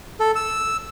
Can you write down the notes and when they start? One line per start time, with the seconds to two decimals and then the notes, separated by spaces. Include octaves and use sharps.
0.20 A4
0.35 E6